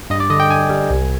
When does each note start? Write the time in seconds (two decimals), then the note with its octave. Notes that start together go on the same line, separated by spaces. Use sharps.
0.10 G2 D#5
0.20 D5
0.30 D3 D#5
0.40 G5
0.50 G2 G#5
0.70 G3
0.90 C2